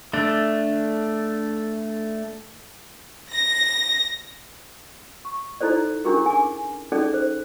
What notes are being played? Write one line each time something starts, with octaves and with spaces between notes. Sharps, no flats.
A3 D4
A#6
C#6
D#4 E4 A4 C5 D5
C#4 D4 E4 G4 G#4 A#4
G#5 D6
C#4 D#4 G#4 A4 D5
C5